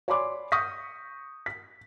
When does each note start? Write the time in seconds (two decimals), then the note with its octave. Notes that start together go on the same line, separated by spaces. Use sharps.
0.08 C#5 D5 G#5 B5 C6 D6
0.52 C#6 D#6 G6 A#6 B6
1.46 B6